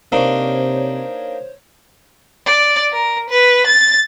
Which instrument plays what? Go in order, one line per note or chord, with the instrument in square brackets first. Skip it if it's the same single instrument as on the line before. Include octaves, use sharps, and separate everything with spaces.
[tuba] C3 [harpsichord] A#3 D4 D#4 [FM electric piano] C5 C#5
[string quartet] D5
A#4
B4
A6